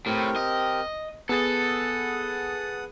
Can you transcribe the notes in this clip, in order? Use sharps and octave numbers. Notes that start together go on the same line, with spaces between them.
A2 C4 G4 A#4
D#5
B3 G#4 A4 F#5 D#6 A6